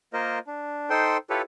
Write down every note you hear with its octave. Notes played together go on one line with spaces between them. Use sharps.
A#3 F4 A#4 C5 D#5
D4
D#4 A4 C5 G5 C6
E4 F4 G4 A4 B4 C#5